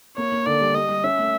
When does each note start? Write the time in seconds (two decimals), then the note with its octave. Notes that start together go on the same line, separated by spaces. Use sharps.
0.17 A#3 C#5
0.32 A#3
0.46 D3 D5
0.61 G3
0.75 G3 D#5
0.89 G3
1.04 C#4 E5
1.19 A3